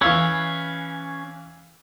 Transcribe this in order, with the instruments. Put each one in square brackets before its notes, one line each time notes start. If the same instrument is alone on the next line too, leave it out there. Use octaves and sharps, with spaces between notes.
[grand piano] E3 F5 E6 [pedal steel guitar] C#4 B4 C#5